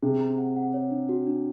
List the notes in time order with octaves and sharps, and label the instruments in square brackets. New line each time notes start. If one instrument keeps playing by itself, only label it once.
[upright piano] C3 [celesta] G#4
[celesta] A#5
F#5
F#5
C#5
D4
F#4
D4